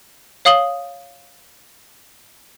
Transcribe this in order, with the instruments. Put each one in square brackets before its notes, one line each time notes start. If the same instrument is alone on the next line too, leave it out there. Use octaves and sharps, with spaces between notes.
[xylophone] C#5 F5 D#6 F#7 G7